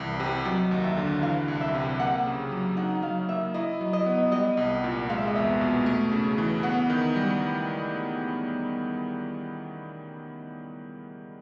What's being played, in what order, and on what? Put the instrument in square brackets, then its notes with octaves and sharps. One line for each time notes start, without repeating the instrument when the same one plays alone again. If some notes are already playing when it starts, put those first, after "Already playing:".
Already playing: [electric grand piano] C2 E3
C3
[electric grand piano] F#3 [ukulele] D#5
[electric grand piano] D#2
[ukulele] E5
[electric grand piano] D3
[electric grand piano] E3 [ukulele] F5
[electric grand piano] C2
[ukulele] E5
[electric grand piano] C3
[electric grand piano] A#3 [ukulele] F#5
[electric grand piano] C#3
F#3
[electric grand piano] D#4 [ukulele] F#5
[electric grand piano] F#3 [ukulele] F5
[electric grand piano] A#3 [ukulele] E5
[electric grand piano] E4 [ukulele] D#5
[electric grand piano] F#3
[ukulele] D#5
[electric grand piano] B3
[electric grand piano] G3 [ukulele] D#5
[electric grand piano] C2
A#2
[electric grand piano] G#3 [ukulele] F5
[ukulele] E5
D#5
[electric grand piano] E2 [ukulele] E5
[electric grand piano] B2
A3
C#3
E3
[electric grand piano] B3 [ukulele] F#5
[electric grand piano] D#3
G3